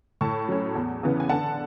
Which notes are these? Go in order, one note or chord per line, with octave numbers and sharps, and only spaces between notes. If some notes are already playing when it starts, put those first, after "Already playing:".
A2 A5 C#6
F#3 C#4
E2
C#3 E3 B3
G#5
D3 F#5 A5